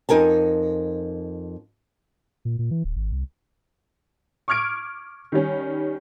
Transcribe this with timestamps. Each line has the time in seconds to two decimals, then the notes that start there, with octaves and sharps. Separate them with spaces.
0.09 F2 D#4 A#4 G#5 A5
2.45 A#2
2.59 A#2
2.71 E3
2.84 D1
2.96 G#1
3.12 C2
4.48 C#6 D6 F6 G#6 D7
5.32 D#3 G3 C#4